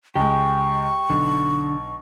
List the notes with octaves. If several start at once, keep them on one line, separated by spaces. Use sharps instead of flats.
C#2 G#3 G4 C#6
B1 D3